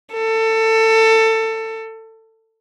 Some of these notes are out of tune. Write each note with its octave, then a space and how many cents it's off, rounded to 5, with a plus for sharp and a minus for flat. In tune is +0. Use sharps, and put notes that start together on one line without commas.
A4 +20